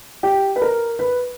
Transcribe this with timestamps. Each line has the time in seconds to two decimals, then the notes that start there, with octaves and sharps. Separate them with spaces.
0.23 G4
0.56 B4
0.62 A#4
0.99 B4